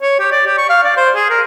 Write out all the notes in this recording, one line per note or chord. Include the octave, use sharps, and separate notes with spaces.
C#5
G4
D5
G4
C#6
F5
D5
C5
G#4
A#4